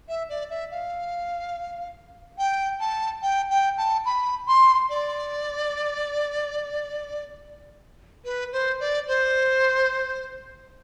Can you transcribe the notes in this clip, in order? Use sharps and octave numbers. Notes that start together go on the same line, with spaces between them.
E5
D5
E5
F5
G5
A5
G5
G5
A5
B5
C6
D5
B4
C5
D5
C5